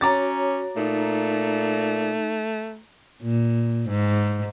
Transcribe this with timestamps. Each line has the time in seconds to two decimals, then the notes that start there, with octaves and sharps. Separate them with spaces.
0.01 C#4 F#4 C#5 A#5 D6 A6
0.76 A#2 A3 D#4
3.22 A#2
3.89 G#2